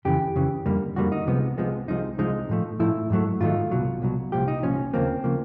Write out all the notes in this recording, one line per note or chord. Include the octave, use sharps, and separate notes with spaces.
F2 C#3 E3 G4
F2 C#3 E3
F2 D3 G3 A#3
F2 D3 G3 A#3 F#4
D#4
C2 C3 F3 G#3 B3
C2 C3 F3 G#3 B3
C2 C3 F3 G#3 D#4
C2 C3 F3 G#3 D#4
A2 F3 A3
A2 F3 A3 E4
G#2 D#3 F#3 A3
G#2 D#3 F#3 A3 F4
C2 B2 F#3
C2 B2 F#3
C2 A#2 F3 G4
D#4
C2 A#2 F3 C#4
D#2 C#3 F3 A#3 C4
C#3 F3 A#3